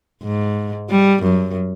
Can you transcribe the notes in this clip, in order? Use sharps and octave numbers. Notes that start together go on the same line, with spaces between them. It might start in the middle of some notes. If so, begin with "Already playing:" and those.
G#2
G3
F#2